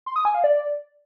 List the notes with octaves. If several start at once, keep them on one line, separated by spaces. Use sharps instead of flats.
C6
D#6
G#5
F5
D5